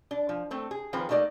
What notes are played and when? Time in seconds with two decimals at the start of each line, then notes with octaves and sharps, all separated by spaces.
0.11 D4
0.29 F3
0.51 A3 C4 A4
0.71 G#4
0.93 D#3 F3 C4 G#4 B4
1.09 A3 A#3 D#4 G4 D5 D#5